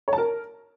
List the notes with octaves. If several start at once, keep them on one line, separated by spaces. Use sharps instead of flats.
C#5
A5
A#4